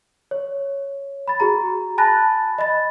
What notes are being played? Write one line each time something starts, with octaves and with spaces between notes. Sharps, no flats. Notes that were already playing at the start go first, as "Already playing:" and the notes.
C#5
B5 A6
F#4 G#4 A#5
G#5 A5 B5 F#6 A6 A#6
D#5 B5 A6